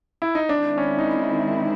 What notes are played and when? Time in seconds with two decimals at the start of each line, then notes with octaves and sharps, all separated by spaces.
0.22 E4
0.35 D#4
0.49 D#3 G#3 C4 D4 E4
0.78 C#4
0.99 D#4